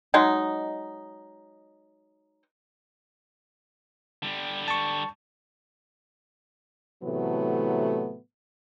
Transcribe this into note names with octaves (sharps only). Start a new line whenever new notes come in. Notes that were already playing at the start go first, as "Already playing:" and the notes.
F#3 G#3 D#4
D3 G3
A5 C#6
A2 C3 E3 F#3 A3 B3